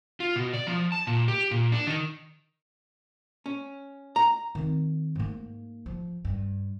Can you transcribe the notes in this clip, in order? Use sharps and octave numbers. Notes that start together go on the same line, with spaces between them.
F4
B2
D5
F3
A5
A#2
G4
A#2
D4
D#3
C#4
A#5
D#3 C4
G#2 A#3
F3
G2